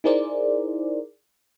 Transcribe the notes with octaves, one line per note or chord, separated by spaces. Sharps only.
D#4 E4 G#4 A#4 C5 D5